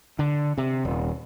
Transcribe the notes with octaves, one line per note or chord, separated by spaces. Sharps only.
D3
C3
D#1